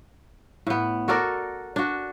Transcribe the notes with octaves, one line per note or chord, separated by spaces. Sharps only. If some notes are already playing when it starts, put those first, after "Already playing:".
A2 B3
F#4 A4 A#4 D5
D4 F#4